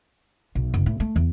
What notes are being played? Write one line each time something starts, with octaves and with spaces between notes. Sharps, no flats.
B1
F#1
A2
A3
E2